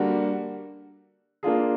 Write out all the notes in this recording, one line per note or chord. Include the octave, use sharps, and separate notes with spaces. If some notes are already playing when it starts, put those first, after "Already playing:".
Already playing: D3 G3 A#3 D4 F#4
A#3 D4 F4 G#4